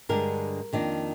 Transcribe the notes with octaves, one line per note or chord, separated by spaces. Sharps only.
G2 D3 G#3 D4 A#4
F2 D#3 A#3 D4